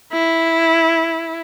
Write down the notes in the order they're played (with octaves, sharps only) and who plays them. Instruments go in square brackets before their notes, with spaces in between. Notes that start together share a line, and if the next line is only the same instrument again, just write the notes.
[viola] E4